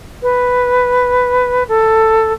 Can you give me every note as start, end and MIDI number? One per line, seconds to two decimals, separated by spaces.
0.22 1.63 71
1.68 2.32 69